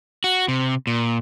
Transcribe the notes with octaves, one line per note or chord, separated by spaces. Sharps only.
F#4
C3
A#2